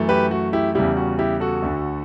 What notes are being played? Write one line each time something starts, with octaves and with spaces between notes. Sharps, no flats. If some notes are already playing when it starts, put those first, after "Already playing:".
Already playing: F#2 E3 A3
G4 B4
F#4
E4 G4
E2 C#3 G3 E4 G4
F#4
E4 G4
F#4 A4
D2 D3 A3